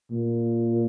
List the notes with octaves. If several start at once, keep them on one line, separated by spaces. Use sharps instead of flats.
A#2